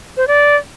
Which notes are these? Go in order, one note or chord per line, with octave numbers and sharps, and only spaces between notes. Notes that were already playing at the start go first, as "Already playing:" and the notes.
C5
D5